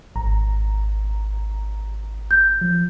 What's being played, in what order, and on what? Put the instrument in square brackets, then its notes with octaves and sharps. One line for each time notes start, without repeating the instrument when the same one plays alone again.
[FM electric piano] G#1 A#5
[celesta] G6
[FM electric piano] F3